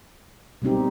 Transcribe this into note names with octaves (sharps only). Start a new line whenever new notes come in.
B2 G3 C4 D#4 G4